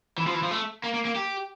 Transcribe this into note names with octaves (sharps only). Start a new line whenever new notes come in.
E3
F3
E3
F3
A3
A#3
A#3
A#3
G4